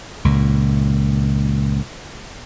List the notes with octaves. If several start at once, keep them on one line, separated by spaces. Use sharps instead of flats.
C#2 A#2